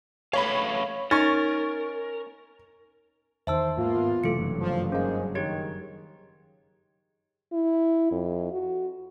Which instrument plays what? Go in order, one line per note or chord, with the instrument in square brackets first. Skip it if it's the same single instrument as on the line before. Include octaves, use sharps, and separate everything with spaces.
[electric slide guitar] A3 B4 F5 [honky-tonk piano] C#5 B5
[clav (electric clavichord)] C#4 [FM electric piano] D#4 [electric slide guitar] A#4 [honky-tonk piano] C#6 A6
[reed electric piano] E2 D#3 [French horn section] C5 [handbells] E5 A5 E6
[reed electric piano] G#2 [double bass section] A#3 B3 [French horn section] F4
[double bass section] F#1 G2 F#3 [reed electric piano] C3 E3 A3 [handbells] A4 C#7
[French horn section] F3
[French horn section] G#3 D#4 G#4 [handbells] C#4 F5 [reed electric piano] A#4 C5
[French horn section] D#3 [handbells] G4 G#4 C#5 [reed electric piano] G#6
[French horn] E4
F2
F#4